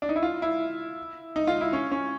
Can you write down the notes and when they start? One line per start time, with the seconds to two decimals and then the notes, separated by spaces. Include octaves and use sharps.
0.02 D4
0.09 D#4
0.16 E4
0.23 F4
0.42 E4
1.36 D#4
1.47 F4
1.61 E4
1.73 C#4
1.92 C#4